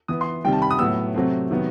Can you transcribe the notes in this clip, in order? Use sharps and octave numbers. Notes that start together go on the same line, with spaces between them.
E3 B3 D#6
C6
C3 D#3 G3 G5
A5
B5
D#6
A2 F#3 B3 E6
C3 F#3 A3 C4
C3 D#3 F#3 B3